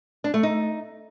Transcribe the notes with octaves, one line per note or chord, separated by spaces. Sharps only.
D4
A3
D#4